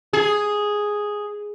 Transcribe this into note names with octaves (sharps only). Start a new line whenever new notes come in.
G#4